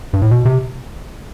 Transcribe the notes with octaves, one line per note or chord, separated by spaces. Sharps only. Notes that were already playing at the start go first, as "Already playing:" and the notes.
G2
A2
B2
C3